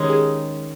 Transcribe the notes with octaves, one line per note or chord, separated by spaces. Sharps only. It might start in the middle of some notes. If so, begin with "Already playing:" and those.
Already playing: D#3 G#3 C#4 G4
G#4